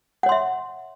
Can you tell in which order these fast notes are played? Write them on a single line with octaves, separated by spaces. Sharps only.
F#5 C#5 C6 E5